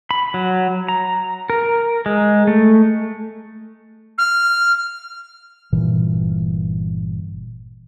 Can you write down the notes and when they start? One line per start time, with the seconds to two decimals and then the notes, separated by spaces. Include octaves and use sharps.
0.11 B5
0.34 F#3
0.88 A#5
1.50 A#4
2.06 G#3
2.47 A3
4.18 F6
5.72 G1 A#2 E3